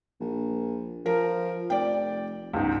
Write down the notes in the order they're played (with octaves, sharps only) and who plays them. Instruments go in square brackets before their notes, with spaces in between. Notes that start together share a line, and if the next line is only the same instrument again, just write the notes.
[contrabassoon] A#1
[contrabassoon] F3 [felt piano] A#4
[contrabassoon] F1 [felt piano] D5 G5
[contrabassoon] G1 [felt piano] C#2 G#2